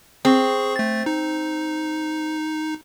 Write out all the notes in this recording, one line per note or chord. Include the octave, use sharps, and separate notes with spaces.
C4 G#4 C#6
A3 A6
D#4